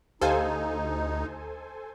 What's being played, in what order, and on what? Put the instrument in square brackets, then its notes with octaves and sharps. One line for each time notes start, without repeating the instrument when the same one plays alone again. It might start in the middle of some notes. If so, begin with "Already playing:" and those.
[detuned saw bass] D2 [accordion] D#4 [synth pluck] G4 F5 [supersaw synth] A4 C5 G#5